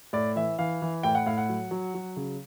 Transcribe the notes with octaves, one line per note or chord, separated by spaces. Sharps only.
A2 D5
E3 E5
E3 F5
E3
A2 G5
F#5
A2 F5
F#5
F#3
F#3
F#3
C#3